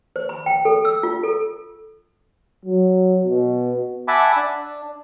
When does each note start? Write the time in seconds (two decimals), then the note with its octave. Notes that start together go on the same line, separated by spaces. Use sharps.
0.16 C5
0.29 B5
0.46 G5
0.65 A4
0.85 E6
1.03 F4
1.24 A4
2.65 F#3
3.26 B2
4.08 E5 F#5 G#5 A5 B5 D6
4.36 D4